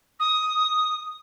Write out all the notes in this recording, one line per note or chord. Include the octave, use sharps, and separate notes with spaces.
D#6